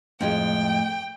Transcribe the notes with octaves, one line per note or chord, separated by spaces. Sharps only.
F2 A2 G#3 A3 G5